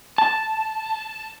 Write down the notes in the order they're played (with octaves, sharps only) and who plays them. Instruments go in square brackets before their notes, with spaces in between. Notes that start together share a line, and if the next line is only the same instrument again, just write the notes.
[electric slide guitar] A5